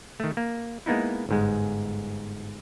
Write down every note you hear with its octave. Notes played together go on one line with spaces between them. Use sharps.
D#3 A3
A#3
G#3 A#3 B3 D#4 E4
G1 G#2 G#3